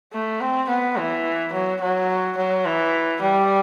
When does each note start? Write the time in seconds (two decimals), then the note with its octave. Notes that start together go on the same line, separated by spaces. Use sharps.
0.13 A3
0.41 C4
0.69 B3
0.97 E3
1.53 F#3
1.81 F#3
2.37 F#3
2.66 E3
3.22 G3